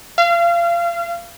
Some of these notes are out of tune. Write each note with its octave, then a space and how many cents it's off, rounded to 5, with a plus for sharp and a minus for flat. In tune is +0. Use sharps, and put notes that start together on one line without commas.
F5 -30